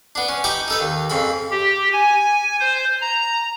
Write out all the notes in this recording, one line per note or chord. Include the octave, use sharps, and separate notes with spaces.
B3 D4
C#4
D#4 G4 B5 C#6 D6
D#4 A4 B4
D#2
F2 C#3 B5
G4
G#5
C5
A#5